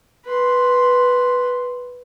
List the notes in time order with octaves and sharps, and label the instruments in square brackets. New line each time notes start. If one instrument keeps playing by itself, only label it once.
[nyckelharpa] B4 C6